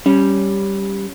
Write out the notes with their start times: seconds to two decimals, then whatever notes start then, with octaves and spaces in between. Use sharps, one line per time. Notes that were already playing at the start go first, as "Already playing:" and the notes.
0.06 G3 C#4